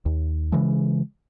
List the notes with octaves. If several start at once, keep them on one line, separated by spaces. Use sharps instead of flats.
D#2
C#3 E3 G#3